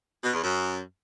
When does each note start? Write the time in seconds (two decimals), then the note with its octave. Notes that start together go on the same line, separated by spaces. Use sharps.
0.23 B2
0.33 E2
0.44 F#2